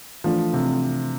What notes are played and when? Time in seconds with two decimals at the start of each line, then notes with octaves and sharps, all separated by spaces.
0.24 E3 F3 A3 D4 A4
0.53 C3